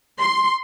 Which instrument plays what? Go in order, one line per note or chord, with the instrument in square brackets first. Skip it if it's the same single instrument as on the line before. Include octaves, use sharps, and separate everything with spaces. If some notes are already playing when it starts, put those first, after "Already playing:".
[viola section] C6